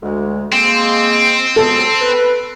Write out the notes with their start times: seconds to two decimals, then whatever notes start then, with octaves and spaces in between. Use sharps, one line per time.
0.03 D2 G#3
0.52 G#3 A#3 C4
1.56 F#3 G#3 B3 A4
2.01 B4